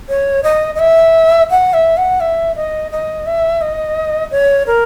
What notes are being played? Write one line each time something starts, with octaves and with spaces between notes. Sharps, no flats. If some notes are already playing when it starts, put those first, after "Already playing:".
C#5
D#5
D#5
E5
F#5
E5
F#5
E5
D#5
D#5
E5
D#5
C#5
A#4